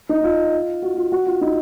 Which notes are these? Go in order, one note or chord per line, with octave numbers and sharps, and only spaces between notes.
D#4
F4
F#4
F4
F#4
F4
D#4